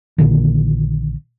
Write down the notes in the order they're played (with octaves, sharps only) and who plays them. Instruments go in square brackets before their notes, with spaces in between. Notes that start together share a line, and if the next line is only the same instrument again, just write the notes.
[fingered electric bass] A#1 A#2 D3 D#3